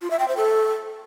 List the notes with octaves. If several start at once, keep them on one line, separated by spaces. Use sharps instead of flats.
F4
E5
G5
C5
A4